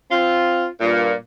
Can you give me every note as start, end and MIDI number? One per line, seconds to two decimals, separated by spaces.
0.11 0.67 60
0.11 0.67 65
0.80 1.15 43
0.80 1.15 46